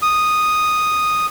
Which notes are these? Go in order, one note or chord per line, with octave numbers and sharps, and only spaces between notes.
D#6